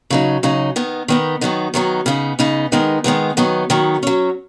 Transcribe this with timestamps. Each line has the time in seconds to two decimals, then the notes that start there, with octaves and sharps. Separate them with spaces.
0.10 C#3 F#3 D#4
0.43 C#3 F#3 D#4
0.76 D#3 B3 D#4
1.08 D#3 B3 D#4
1.41 D#3 F#3 B3 D#4
1.74 D#3 F#3 B3 D#4
2.06 C#3 B3 D#4
2.39 C#3 B3 D#4
2.72 D#3 G#3 B3 D#4
3.04 D#3 G#3 B3 D#4
3.37 D#3 F#3 B3 D#4
3.70 D#3 F#3 B3 D#4
4.03 F#3 C#4